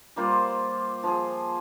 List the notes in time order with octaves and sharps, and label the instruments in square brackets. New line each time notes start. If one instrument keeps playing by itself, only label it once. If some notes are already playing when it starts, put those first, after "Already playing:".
[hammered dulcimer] G3 A#3 F4 C5
F3 G#4